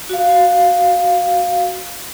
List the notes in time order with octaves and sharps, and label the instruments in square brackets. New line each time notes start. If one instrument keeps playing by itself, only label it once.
[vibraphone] F#4 F5